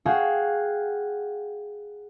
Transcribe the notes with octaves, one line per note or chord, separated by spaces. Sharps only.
F#4 G#4 F5 G5